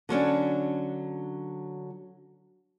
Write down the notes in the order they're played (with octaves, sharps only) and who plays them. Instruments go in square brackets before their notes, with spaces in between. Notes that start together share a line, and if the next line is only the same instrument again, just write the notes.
[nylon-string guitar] D3 F#3 C#4 D4